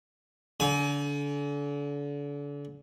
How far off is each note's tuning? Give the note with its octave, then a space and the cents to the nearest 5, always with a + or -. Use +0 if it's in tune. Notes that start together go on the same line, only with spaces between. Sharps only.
D3 -35 G#5 +25